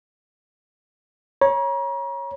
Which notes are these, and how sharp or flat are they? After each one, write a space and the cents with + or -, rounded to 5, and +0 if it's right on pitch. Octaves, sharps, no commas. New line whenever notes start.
C#5 -10 A#5 +40